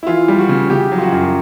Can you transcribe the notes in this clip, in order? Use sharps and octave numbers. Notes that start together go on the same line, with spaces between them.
E4
E3 F4
G3
F#4
C#3
C#3 G4
F#3
F4
F#4
F#2